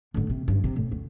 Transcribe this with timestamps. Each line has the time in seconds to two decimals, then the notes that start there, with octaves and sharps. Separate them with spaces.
0.14 A2 D3
0.30 C3
0.48 G2
0.64 C3
0.76 A2
0.92 D2